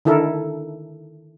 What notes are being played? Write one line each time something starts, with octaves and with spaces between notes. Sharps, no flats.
D3 D#3 E4 A4 A#4